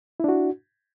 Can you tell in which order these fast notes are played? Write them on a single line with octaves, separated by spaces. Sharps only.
E4 D4 F#4